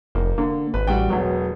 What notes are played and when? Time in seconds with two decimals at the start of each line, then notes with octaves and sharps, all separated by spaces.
0.15 F1 A#3 D#4
0.38 D3 A#3
0.74 G#1 B4
0.87 A1 G3 F#4 G5
1.10 E1 F#3 B3